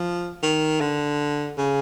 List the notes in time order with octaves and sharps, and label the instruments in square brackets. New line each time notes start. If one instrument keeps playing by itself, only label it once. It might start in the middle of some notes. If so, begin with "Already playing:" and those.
Already playing: [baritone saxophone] F3
D#3
D3
C#3